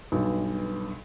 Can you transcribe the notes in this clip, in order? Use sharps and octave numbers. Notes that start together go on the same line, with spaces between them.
B1 G2 B2